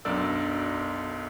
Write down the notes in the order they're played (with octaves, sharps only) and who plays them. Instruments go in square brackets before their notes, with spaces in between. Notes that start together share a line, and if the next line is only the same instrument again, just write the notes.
[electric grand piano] B1 F#2 D4 A#4 D5 E6